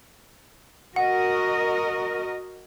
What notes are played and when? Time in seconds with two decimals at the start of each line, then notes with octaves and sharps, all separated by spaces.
0.96 F#4 A#4 D#5 F#5